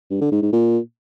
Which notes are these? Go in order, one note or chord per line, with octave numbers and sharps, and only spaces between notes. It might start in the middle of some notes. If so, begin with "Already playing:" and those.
G2
D3
G#2
G#2
A#2